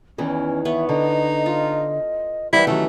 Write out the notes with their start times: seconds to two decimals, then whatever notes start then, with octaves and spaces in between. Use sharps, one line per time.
0.18 E2 D#3 E3 C#4
0.65 B3 C#5 E5
0.89 D3 D#4 D#5
1.46 F4
2.53 E3 G3 E4 C5 F#5 G5
2.67 D#3 F#3 A3 C#4 G4